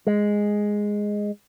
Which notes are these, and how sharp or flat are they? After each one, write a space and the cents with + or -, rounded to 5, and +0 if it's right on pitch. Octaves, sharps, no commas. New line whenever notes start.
G#3 -5